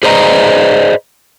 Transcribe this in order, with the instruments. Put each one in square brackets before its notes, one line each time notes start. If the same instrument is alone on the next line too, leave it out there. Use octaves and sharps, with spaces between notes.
[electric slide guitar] G#4 B4 C5 D5 D#5 A#5